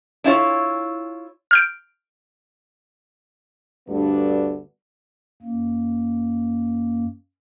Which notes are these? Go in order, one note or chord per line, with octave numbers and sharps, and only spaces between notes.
D4 E4 F4 C#5
F6 G6 D7
D2 G2 A3 B3 D4
F#2 A#3